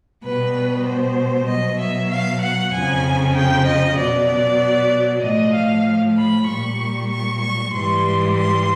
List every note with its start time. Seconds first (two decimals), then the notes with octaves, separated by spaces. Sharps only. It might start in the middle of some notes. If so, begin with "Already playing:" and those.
0.23 B2 G3 B4
0.86 C5
1.48 B2 F#3 D#5
1.79 E5
2.12 F5
2.42 F#5
2.74 F2 C#3 F3 G#5
3.36 G5
3.67 D#5
3.98 B2 F#3 D5
5.23 A2 F3 D#5
5.55 F5
6.16 B5
6.48 A#2 G3 C#6
7.11 C#6
7.42 C#6
7.73 G#2 E3 G3 C6
8.35 C6